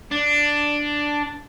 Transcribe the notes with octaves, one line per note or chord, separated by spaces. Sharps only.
D4